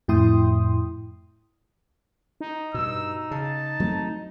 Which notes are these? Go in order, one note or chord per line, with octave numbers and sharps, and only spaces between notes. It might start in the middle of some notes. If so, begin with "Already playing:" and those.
F2 A2 E4 G5 C6 D#6
D#4
G2 B2 E6
C#3 A5
F#3 A3 C4